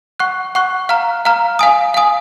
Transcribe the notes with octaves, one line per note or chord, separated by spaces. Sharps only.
F#5 C#6 F#6
F#5 C#6 F#6
F5 A#5 F6
F5 A#5 F6
F5 G#5 D#6
F5 G#5 D#6